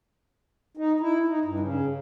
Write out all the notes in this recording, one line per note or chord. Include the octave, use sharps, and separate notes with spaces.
D#4
E4
D#4
G2
C#3